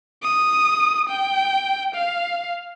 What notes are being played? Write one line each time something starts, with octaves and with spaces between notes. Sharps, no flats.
D#6
G5
F5